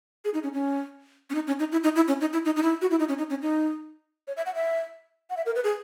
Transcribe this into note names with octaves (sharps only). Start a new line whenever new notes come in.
G#4
D#4
C#4
C#4
C#4
D#4
C#4
D#4
E4
D#4
E4
C#4
D#4
E4
D#4
D#4
E4
F#4
E4
D#4
C#4
D#4
C#4
D#4
C#5
E5
F#5
E5
F#5
E5
A#4
B4
G#4